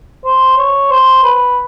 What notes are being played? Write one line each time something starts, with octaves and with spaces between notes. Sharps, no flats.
C5
C#5
C5
B4